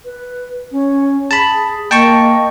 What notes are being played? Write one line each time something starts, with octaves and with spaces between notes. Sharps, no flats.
B4
C#4
G#4 A5 B5
A#3 D#5 G5 A5 C#6